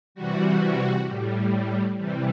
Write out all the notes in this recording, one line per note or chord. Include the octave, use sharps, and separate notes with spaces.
C3 E3 G3 F#4
A2 G3
C3 E3 G3